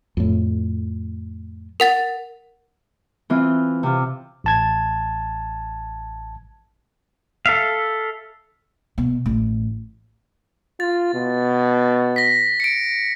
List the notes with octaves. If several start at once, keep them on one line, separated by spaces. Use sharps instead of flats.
F2 A2
A#4 F#5 A6
E3 C4 F4
C3 F4
A1 A5 G#6
A4 E5 F5
B2
A1
F4 A6
B2
A#6 B6
C#7 D7